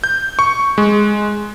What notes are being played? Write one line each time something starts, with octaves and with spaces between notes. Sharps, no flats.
G6
C#6
G#3